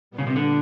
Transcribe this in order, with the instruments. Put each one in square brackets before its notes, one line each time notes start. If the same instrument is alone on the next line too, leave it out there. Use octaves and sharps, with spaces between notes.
[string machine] A#2 G3 B3
[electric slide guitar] C#3
C3
D3